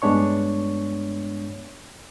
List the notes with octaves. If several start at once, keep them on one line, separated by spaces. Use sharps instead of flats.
G2 G#3 B3 D4 C#5 C#6